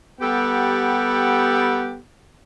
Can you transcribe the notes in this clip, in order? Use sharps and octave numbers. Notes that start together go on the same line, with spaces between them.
G3 B3 G4 A4 F#5